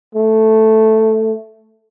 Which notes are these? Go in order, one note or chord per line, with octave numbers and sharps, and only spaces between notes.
A3